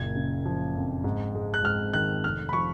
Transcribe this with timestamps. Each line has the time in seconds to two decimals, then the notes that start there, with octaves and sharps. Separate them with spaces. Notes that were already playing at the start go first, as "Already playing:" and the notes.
Already playing: F#1 A#2 G#6
0.16 C#3
0.45 F3
0.75 F2
1.04 G#2
1.35 G#3
1.54 F#6
1.64 G#2 F6
1.93 D#3 F#6
2.24 F1 F6
2.49 B5
2.53 F3 C#6